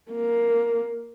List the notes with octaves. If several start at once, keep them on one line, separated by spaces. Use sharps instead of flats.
A#3